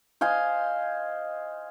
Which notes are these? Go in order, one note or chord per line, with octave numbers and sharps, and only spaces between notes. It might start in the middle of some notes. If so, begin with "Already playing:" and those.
C5 D#5 F5 G#5